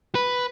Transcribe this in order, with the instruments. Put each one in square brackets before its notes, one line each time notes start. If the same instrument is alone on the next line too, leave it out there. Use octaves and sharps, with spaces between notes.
[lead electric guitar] B4